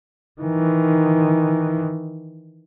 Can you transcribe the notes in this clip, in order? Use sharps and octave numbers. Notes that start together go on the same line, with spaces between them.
D#3 E3